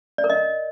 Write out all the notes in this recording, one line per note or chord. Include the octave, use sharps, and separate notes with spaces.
D5
A#4
D#5